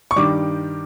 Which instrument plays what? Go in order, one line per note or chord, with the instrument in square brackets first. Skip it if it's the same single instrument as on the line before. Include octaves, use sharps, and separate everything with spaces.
[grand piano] C#6
G2 D#3 G3 D6